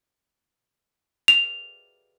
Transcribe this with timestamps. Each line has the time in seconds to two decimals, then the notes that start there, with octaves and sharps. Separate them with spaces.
1.28 F7